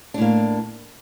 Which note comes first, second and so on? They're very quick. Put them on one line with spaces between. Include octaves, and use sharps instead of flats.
D4 A2 A#3